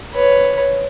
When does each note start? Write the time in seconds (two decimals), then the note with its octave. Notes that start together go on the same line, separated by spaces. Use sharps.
0.14 B4 C#5